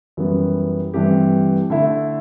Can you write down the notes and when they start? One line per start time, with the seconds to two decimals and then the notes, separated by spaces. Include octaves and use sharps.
0.17 F#2 E3 G3 B3
0.94 G2 E3 A3 C4 G4
1.70 D3 A3 E4